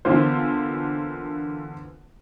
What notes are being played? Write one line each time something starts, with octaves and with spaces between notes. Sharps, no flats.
D3 E3 A#3 B3 F4 C5